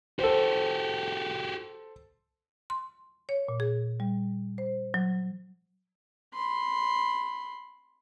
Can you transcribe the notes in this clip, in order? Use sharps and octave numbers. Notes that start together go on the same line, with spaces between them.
F#4 G4 A4 C5
C6
C#5
A#2
G#4
G3
C5
F#3
B5 C6